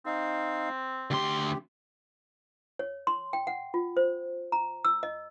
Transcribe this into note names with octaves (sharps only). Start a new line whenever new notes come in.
C4 D#4 F5
D2 G4 C6
C#5
C6
G5
F#5
F4
C5
A#5
E6
D#5